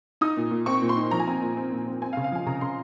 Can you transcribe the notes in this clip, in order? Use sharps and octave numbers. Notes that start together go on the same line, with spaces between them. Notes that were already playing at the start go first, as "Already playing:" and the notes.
D#4 D#6
A#2
A#2
C4 C#6
A#2
C6
D#4
F3 A#5
G#5
C4 A#5
A#2
C4
A#2
C4
C4 G#5
F5
C#3
F5
F3 G#5
C#3 A#5
C#3 C6